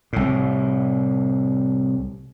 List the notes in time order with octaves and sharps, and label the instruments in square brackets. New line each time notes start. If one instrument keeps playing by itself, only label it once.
[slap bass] C2 A2